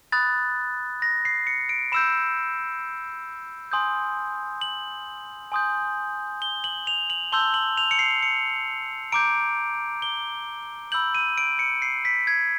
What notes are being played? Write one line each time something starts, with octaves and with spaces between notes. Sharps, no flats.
B5 D#6 F#6 A6
A#6
C7
C#7
D7
B5 E6 G6 E7
G#5 C6 D#6 G6
F#7
G#5 C6 D#6 G6
G7
F#7
F7
F#7
A5 C6 E6 G6 G7
F#7
F7
C#7
C7
C#7
A#5 D6 G6 D7
G7
B5 E6 G6 F#7
D#7
D7
C#7
C7
B6
G#6